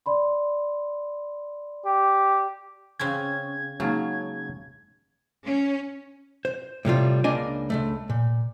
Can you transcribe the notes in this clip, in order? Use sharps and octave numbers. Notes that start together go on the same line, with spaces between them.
D5 B5 C6
G4
C#3 C4 C#4 G#6
C#3 F#3 G#3 A#3 D#4 F5 A5
C#4
C5
A2 C3 G3 F4
C#2 A#3 D4 D#5 G#5
C#2 C#3 A3
A#2